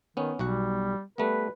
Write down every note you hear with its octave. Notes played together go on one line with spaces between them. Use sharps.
D#3 B3 C#4
B1 G3 F#4 F#5
G3 A3 B3 B4